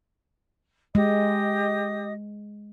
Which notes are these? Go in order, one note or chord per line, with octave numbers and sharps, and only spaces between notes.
G#3 G4 D#5 D#6